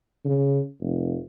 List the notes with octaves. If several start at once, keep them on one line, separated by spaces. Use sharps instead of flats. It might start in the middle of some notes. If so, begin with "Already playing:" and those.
C#3
F1